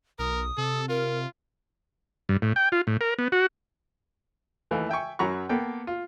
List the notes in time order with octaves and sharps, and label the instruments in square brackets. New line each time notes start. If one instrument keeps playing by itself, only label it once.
[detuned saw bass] B1 [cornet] A#4 [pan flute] D#6
[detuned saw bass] C3 [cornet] A4
[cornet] F4 [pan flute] A#4
[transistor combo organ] G2
A2
G5
F4
A2
A#4
B3
F#4
[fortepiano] D#2 E3 A3 F5
E5 G5 G#5 C#6
F#2 F#3 A#5 B5 C#6
A#3 B3 A4 G5
F4